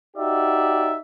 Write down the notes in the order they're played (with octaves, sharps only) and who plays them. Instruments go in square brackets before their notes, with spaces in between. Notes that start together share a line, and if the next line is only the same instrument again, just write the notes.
[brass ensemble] D#4 F#4 G4 D5 E5